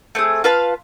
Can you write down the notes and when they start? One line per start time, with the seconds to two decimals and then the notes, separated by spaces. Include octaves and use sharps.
0.15 A3 C4 G#4
0.44 F4 B4 F5 A5